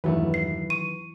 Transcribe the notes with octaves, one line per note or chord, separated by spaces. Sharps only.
E1 G2 D#3 E3 F#3 A3 B4
C7
C#6 D#7